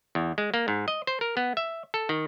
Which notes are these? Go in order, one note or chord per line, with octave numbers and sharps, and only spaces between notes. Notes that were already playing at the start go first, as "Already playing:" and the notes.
E2
G#3
A#3
G#2
D#5
C5
A#4
B3
E5
A4
D#3